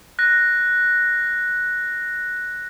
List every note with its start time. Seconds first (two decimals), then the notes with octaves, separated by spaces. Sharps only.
0.19 F#6 A#6